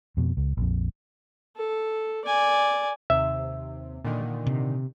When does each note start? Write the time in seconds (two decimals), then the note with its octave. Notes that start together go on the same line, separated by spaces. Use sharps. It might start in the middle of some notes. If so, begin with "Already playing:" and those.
0.17 F2 B2
0.37 C#2
0.57 A#1 F2
1.57 A4
2.25 D5 G#5
3.10 D#2 C3 E5
4.04 A#2 D3 D#3
4.46 C3